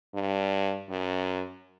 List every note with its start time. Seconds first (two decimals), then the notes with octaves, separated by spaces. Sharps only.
0.15 G2
0.89 F#2